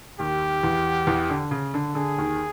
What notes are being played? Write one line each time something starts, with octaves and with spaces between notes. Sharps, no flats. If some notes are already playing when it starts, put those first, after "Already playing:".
D#2 D#3 G4
E2 E3
E2 E3
D3
C#3
D3
D3 G#4
D#2 D#3